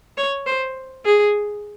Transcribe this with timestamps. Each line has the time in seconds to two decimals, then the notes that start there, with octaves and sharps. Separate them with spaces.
0.18 C#5
0.47 C5
1.06 G#4